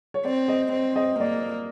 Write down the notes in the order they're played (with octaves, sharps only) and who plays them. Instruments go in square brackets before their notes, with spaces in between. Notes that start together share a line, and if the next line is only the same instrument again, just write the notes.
[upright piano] C#5
[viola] C4 [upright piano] D5
[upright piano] D#5
[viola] C4
[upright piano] D#5
[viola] A#3 [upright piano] D5